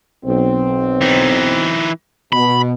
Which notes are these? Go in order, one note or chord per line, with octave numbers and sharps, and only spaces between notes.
B1 C4
E3 D#4
B2 B5